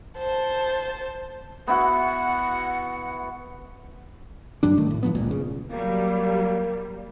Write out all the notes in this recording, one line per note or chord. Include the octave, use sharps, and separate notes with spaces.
C5 A5
B3 E4 F#4 F#5
G2 F#3 G3 D4
D#3 A3
A2
A2 F3 A#3 B3
G#1 C#2 A#2
C#3
F#3 G3 A#3